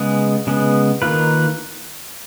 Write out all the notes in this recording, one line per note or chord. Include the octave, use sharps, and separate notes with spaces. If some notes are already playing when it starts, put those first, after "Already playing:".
Already playing: C#3 G#3 B3
C#3 G#3 B3
D#3 A#3 F4 B4